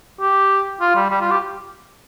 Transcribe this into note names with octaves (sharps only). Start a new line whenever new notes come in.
G4
F4
G3
G3
F4
G4